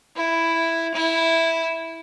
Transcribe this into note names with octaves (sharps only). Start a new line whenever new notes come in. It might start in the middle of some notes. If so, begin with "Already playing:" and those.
E4
E4